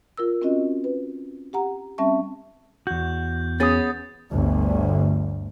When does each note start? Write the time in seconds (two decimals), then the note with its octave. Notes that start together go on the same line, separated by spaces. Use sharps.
0.17 F4 A#4 E6
0.42 C4 C#4 F4 F#4 D#5
0.84 B4
1.53 G4 F#5 A#5
1.98 G3 C4 C#4 E5 A5 C#6
2.87 E2 F#4 G6
3.60 B3 C#4 G#4 D#6 A6
4.31 G1 D2